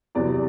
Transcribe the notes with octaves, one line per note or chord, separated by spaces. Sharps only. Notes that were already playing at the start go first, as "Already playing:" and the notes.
E2 C3 F#3 D5